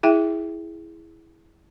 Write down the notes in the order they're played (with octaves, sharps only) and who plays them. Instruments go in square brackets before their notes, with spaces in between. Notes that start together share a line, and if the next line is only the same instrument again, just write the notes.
[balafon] E4 G#4 E5 G5